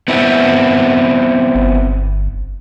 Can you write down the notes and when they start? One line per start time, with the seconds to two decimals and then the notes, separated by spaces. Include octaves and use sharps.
0.08 B3 C4 E4
1.55 G1